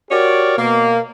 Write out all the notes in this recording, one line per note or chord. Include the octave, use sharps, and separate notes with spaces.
F#4 G4 A#4 C#5 D5
B2 A#3